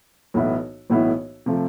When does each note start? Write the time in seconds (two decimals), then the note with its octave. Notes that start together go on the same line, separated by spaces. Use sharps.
0.34 B1 A2 E3 B3 E4
0.90 B1 A2 E3 B3 E4
1.46 C3 F3 A3